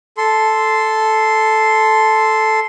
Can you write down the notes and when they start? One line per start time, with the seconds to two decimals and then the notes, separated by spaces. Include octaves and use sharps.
0.17 A4 C6